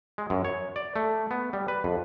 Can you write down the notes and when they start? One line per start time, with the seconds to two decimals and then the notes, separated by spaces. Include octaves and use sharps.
0.18 G#3
0.30 F#2
0.45 C#5
0.76 D5
0.96 A3
1.31 B3
1.53 G3
1.68 B4
1.84 F2